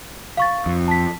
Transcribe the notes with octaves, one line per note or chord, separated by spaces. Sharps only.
F5 C#6 A6
F2
A5 B6